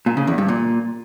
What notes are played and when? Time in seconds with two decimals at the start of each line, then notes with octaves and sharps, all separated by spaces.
0.06 A#2
0.17 C#3
0.27 E2
0.38 G2
0.48 A#2